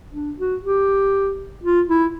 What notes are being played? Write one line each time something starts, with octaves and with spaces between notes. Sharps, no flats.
D4
F#4
G4
F4
E4